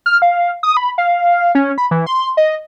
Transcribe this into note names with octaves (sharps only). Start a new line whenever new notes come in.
F6
F5
D#6
B5
F5
C#4
B5
E3
C6
D#5